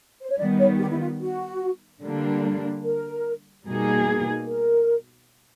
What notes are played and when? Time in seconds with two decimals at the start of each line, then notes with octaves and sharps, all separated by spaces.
0.22 C5
0.30 C#5
0.39 D#3 G3 B3 D5
0.59 C#5
0.79 G4
0.90 E4
1.00 F4
1.21 F#4
2.01 D3 G3 A#3 D4
2.84 A#4
3.65 B2 G3 A#3 D#4 G#4
4.47 A#4